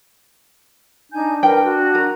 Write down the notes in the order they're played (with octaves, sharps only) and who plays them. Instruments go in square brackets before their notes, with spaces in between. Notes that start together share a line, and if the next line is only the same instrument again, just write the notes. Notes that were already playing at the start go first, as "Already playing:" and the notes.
[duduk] D4 [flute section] D#4 G#5 G6
[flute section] A#4 B4 [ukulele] G5
[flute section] F#4
[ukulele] A#4